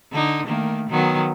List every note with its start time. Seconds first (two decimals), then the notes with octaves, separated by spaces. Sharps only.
0.12 D3 D#4
0.46 D#3 A3 A#3
0.90 D#3 F#3 B3